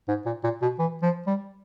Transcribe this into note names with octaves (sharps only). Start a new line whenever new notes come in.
G#2
A#2
A#2
B2
E3
F3
G3